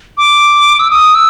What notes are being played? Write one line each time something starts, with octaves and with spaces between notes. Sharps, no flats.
D6
E6
D#6
E6